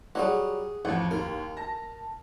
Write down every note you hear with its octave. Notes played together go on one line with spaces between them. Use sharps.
F#3 G3 A#3 G#4 F#5
A1 F2 F#5
D#2 A#4
A5 A#6